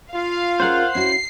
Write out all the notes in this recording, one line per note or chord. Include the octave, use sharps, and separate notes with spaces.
F4 F5
C#4 G#4 A#4 C5 F#5
C#4 E4 F#4 C7